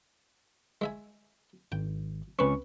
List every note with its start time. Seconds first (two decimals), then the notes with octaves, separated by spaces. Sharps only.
0.81 G#3 E5 G#5
1.72 G#1 G5
2.39 C#2 C4 C#4 B4 C#6